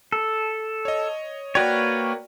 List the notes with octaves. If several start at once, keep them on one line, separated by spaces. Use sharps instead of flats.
A4
C#5 D#5
A#3 F#4 B4 C#5 D5 G5